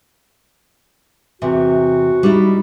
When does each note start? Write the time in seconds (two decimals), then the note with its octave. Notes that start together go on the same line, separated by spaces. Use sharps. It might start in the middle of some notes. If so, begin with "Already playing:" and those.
1.42 E2 C3 F#4
2.23 G3 D#4 E4